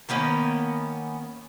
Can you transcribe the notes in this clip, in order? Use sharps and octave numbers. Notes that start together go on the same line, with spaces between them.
D#3 A#3 B3 C#4